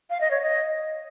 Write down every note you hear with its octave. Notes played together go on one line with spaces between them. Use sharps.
F5
D#5
C#5
D#5